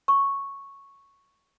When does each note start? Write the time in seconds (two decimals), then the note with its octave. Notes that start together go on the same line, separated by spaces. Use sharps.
0.08 C#6